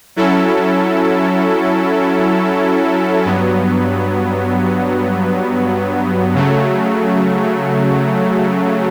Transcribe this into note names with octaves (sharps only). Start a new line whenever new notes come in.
F#3 C#4 E4 A4
G2 F#3 B3
C#3 F#3 A3